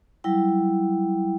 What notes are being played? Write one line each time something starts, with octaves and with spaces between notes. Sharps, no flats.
F#3 G3 E4 G5